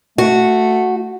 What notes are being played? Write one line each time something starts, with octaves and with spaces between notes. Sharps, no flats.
A3 F#4